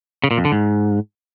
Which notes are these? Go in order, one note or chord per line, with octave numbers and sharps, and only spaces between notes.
C#3
A#2
F2
D3
G#2